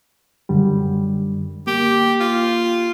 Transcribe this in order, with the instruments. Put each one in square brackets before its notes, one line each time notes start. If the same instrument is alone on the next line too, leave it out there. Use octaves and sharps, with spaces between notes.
[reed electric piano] F#2 D3 G3
[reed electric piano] A#3 [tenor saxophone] G4
[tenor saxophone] F4